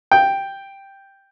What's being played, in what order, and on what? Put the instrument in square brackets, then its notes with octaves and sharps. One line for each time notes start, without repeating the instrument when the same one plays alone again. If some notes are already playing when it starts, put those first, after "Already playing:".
[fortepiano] G5